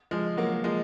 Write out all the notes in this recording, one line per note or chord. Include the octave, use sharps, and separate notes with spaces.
F3 G#3
F#3 A#3
F3 G#3